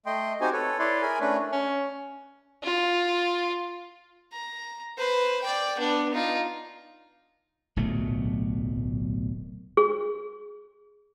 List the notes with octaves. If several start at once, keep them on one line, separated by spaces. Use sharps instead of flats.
A3 D#5 G5 C6
C4 D#4 F#4 G4 C5 G#5
A4 B4 C#5
E4 B4 C#5 D5 C6
G#4 A#4 G#5 B5
A3 C#4 D4 B4
C#4
F4
A#5
B4 C5
D5 G5
B3 D4
D#4 F4
D1 B1 A#2 A3
G#4